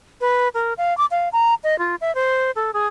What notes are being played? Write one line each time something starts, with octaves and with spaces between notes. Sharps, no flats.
B4
A#4
F5
D6
F5
A#5
D#5
F4
E5
C5
A4
G#4